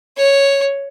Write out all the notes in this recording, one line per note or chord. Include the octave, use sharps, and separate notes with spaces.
C#5